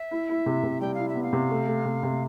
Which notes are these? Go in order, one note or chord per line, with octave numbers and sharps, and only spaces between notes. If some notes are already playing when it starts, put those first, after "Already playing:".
Already playing: E5
E4
E4
C3
C3
G3 G5
E4 F5
E5
B3
F5
C3
A3
A3
C3
C3